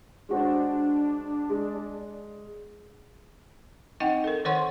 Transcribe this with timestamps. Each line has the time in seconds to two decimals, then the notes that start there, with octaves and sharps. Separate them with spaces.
0.29 G#3 D4 F#4 C5
1.50 G#3
4.00 C4 D#4 D#5 F#5 G5
4.24 A4 A#4
4.45 D#3 C5 C#5 F#5 C6 C#6